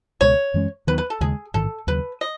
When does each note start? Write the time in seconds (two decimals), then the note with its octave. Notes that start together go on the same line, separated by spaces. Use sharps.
0.21 C#2 B2 G#3 C#5
0.54 F#2 E3 G#3 C#4
0.87 D#2 D#3 F#3 B3 B4
0.98 B4
1.10 A4
1.21 D#2 C#3 G#3 G#4
1.54 A1 G#2 D#3 A4
1.87 D#2 C#3 F#3 B4
2.21 D#5